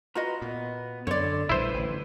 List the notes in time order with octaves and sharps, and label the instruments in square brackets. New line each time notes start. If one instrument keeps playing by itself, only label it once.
[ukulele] F4 F#4 D#5 [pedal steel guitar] B4 A#5
[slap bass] A#2 [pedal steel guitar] B3
[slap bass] F#2 [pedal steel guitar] D3 C6 [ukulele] C#5 D5
[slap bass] A#1 A2 G3 [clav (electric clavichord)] E4 C5 [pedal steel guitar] B4
[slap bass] A1 D3